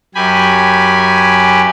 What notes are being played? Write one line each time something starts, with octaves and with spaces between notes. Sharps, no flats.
F#2 G4 G#5 B5